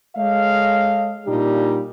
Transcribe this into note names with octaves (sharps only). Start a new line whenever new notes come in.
G#3 A4 C#5 D#5 F5
A#2 G3 D4 D#4 G4